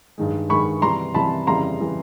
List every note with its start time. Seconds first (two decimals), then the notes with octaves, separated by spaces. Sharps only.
0.18 G2 D#3 G#3
0.49 G2 D#3 G#3 B5 C#6
0.82 C3 E3 G3 A#5 C6
1.14 C3 E3 G3 A5 B5
1.47 F2 C#3 E3 G3 A#5 C6
1.80 C#3 E3 G3